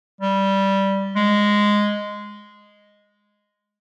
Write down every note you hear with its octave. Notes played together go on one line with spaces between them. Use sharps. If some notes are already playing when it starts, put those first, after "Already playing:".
G3
G#3